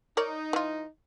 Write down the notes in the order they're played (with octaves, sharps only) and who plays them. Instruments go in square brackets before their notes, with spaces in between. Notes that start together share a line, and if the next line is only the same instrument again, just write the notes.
[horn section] D#4 [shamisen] A#4 C#5 D5
[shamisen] E3 F4